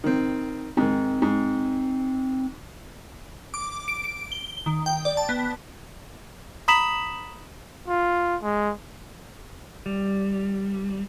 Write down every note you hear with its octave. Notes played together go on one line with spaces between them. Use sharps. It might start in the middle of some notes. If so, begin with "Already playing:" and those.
D#3 C4
G#2 D#3 C4
G#2
D6
D7
D7
G7
D#3
G5
D5
A5
B3
A#5 B5 D#6 B6 E7 F#7
F4
G#3
G3